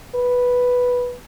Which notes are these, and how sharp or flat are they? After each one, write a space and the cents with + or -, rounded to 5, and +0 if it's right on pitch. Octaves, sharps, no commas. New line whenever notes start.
B4 -5